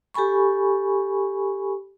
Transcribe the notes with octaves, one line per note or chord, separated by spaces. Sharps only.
G4 A4 G#5 B5 C#6